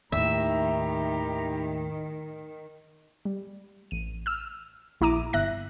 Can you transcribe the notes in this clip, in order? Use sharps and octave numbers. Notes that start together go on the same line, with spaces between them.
D#2 A2 D#3 E4 G4 E5 A#5
G3
A1 D#7
E6 F6
A#1 E4 A#5 D6 D#7
G1 E5 F#6 A#6